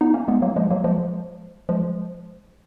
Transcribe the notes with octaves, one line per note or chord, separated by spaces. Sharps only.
B3 D#4
A#3 C#4
G#3 B3
F#3 A#3
F3 G#3
F#3 A#3
F3 G#3
F3 G#3